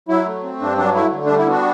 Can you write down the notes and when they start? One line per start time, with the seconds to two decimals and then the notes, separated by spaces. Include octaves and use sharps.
0.09 F#3 E4
0.26 A3
0.43 C4
0.60 G2 D4
0.78 F#3 D4
0.95 A3 E4
1.12 D3
1.26 G3 D4
1.38 E4
1.47 B3 D4 F#4